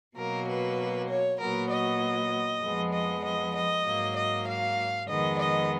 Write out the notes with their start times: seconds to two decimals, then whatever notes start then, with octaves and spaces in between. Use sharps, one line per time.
0.16 B2 F#3 A#3 A#4
0.47 B4
1.08 C#5
1.39 A#2 F#3 B3 A#4
1.70 D#5
2.61 F2 F3 G#3 B3
2.92 D#5
3.23 D#5
3.54 D#5
3.84 G#2 F#3 A#3
4.15 D#5
4.47 F5
5.07 F2 D#3 G#3 B3 D#5
5.39 D#5